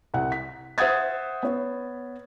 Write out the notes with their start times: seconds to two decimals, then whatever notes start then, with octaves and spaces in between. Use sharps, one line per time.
0.14 C2 F#5
0.32 B6
0.78 C5 E5 F#5 D#6 G#6 A6
1.43 B3 C#5